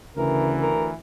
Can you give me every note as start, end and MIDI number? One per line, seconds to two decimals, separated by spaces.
0.17 0.93 38
0.17 0.69 49
0.17 0.93 52
0.17 0.55 70
0.61 0.88 70